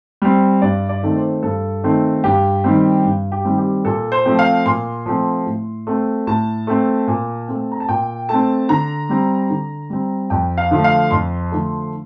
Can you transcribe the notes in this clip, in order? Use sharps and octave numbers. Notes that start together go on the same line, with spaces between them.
G3 C4
G2 D5
D5
D#3 A3 C4
C5
G2 A4
D#3 A3 C4
G2 G4
D#3 G3 C4
G2
G4
D#3 G3 C4
G4
A#2 A4
C5
F3 A3 C4
F5
A#2 C6
F3 A3 C4
A2
A3 C4
A2 A5
A3 C4
A#2
A3 C4
A#5
A5
A#2 G5
A3 C4 A5
D3 A#5
G3 C4
D3
G3 C4
F2 G5
F5
D3 F3 A3
F5
F2 C6
D3 F3 A3